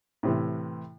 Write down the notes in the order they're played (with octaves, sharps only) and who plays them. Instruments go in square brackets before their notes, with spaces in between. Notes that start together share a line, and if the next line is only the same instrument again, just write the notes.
[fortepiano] A2 C3 E3